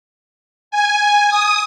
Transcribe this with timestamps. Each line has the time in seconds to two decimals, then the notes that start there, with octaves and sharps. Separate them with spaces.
0.71 G#5
1.29 D#6